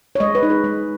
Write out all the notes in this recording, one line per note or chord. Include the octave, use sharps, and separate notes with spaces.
C#5
G#3 D#5
B4
D#4
G#4
G#3